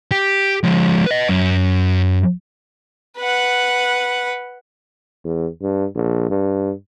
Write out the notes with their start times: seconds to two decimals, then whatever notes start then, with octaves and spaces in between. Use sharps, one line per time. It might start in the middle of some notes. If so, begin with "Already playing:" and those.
0.11 G4
0.64 F3 G#3
1.06 B4 D#5
1.29 F#2
3.18 B4 F#5
5.25 E2
5.62 G2
5.96 A#1
6.30 G2